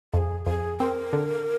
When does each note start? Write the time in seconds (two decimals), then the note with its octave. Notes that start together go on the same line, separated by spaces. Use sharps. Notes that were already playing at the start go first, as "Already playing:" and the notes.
0.13 F2 G#4 A4
0.47 F2 G#4
0.80 C4 A#4
1.13 D3